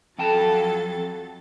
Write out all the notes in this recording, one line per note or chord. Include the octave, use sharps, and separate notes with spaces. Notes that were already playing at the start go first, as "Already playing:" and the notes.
F2 F#3 A4 G5 A5 A6